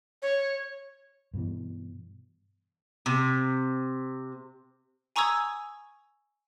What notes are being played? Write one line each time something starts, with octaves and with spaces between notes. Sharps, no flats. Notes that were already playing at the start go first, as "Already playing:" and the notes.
C#5
G2 B2 E3
C3
G#5 A#5 C#6 D#6 E6 G#6